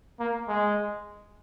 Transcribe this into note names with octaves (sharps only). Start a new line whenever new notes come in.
A#3
G#3